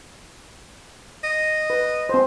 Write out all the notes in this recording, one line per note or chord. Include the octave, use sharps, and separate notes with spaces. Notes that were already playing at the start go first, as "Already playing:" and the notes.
D#5
B4
C4 C5